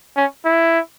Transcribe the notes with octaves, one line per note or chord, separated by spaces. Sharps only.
C#4
E4